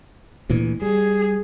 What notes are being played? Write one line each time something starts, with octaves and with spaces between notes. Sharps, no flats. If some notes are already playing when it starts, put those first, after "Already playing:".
D2 A#2 E3
G3 G#4